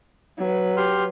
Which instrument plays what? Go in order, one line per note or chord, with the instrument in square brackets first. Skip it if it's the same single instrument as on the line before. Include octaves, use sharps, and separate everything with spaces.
[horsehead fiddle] F#3 B4
[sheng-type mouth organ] G4 C6 F6